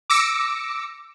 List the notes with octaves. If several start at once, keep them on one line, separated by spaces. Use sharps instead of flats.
D6 E6 A#6 C#7